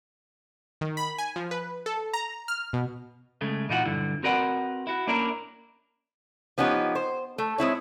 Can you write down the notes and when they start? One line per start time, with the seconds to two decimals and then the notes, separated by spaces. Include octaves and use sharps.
0.81 D#3
0.97 B5
1.18 G#5
1.36 F3
1.51 B4
1.86 A4
2.14 A#5
2.48 F6
2.73 B2
3.41 C#3 G#3 A3
3.69 A#2 E3 D#4 F4 F#4 F#5
3.86 B1 G2 D3 E4
4.23 C4 F#4 A#4 B4 D5 F#5
4.87 E4 F#4
5.07 A#3 C#4 D4 E4 A#4
6.58 F3 B3 C#4 D#4 G4
6.95 C5
7.38 A3
7.58 G#3 C4 E4 C#5